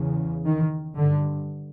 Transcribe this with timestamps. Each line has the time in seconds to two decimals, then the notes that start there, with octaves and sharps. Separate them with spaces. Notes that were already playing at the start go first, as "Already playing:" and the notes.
Already playing: E2 C#3
0.43 D#3
0.96 G2 D3